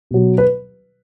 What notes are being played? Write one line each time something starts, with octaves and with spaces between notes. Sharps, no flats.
B2 F#3
B4